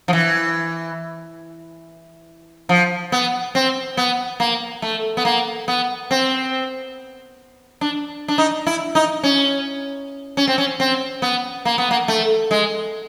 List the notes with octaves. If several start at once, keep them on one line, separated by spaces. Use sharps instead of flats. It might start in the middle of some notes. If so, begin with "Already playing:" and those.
F3
E3
F3
B3
C4
B3
A#3
A3
B3
A#3
B3
C4
D4
D4
D#4
E4
D#4
C#4
C#4
C4
C#4
C4
B3
A#3
B3
A#3
A3
G#3